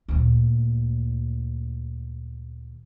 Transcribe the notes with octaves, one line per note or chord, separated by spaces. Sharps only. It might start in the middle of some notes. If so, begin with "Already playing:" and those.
D2 A#2